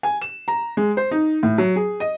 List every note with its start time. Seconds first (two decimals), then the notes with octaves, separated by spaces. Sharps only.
0.03 G#5
0.21 E7
0.48 A#5
0.77 G#3
0.97 C5
1.11 D#4
1.43 A2
1.58 F#3
1.76 G#4
2.00 D#5